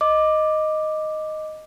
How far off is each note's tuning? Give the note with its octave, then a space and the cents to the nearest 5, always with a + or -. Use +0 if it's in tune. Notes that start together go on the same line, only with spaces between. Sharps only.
D#5 +0 D6 +5